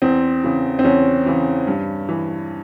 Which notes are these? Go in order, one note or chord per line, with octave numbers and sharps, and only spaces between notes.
E2 C4
C#3 E3
C4
E2 C#4
C#3 E3
G2
E3